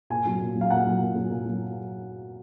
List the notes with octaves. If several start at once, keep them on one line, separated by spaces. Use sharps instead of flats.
A#2 G#5
F#3
A#2
F#3
F5
A#2 F#5
F#3
A#2
F#3
A#2
F#3